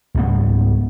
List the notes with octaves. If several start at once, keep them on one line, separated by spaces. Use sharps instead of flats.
C#2 G#2 G3 B3